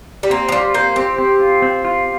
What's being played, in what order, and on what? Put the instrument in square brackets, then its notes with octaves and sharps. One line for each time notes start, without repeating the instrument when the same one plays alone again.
[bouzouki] G3
[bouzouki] A#3 [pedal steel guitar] C4
[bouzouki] F3
[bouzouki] G3 [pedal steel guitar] F4
[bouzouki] A#3 [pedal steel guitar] C5
[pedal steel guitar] C4 [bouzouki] G4
[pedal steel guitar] C4
F4
C4
F4